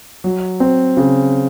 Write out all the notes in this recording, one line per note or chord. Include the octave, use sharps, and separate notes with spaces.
F#3
C4
C#3